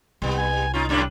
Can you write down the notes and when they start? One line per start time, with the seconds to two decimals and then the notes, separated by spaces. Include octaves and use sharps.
0.22 C2 G3 B3
0.38 G#5
0.74 C#4 D#4 F4
0.89 F#2 A2 G3 D4